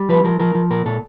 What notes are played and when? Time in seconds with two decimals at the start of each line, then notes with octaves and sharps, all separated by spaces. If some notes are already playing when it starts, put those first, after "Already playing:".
Already playing: G3
0.09 F3 B4
0.24 F3 A#4
0.39 F3 A#4
0.55 F3
0.70 A#2 A#4
0.86 A#2 A4